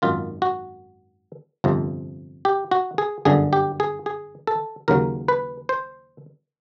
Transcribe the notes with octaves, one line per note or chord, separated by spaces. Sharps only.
G#1 F#2 D#3 F4
F#4
G1 F2 C3 F3
G4
F#4
G#4
G1 F#2 D3 G#4
G4
G#4
G#4
A4
D#2 C#3 F#3 A#4
B4
C5